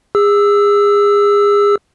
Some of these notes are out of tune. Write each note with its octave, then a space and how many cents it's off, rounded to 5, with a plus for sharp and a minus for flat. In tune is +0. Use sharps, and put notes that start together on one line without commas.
G#4 -30 E6 +0